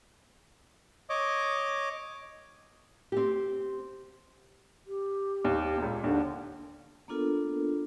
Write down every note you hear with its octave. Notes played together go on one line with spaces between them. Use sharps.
C#5 D#5 D6
C4 G4
G4
D#2
C#2 A#2
D#2 D3 D4
A#3 B3 D4 F4 A4 A#4